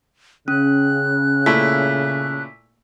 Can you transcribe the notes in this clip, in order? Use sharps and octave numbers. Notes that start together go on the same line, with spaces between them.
C#3 C#4 F#6
A#2 A3 E4 B6